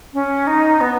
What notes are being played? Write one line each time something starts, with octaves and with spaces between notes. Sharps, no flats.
C#4
D#4
B3